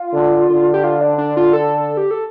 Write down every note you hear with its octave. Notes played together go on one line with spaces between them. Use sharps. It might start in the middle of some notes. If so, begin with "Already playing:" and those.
Already playing: F4
D3
D3
G4
F4
D4
D4
F4
A4
G4
A4